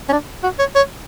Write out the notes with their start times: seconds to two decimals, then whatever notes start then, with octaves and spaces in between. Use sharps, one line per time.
0.09 C#4
0.13 D4
0.43 F#4
0.59 C#5
0.75 C#5